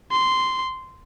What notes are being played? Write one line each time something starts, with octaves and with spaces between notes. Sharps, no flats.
C6